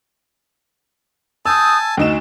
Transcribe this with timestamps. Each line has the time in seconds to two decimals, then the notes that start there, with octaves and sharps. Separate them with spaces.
1.46 G#5 A5 D#6 E6 G6
1.97 D2 D#4 F#4 E7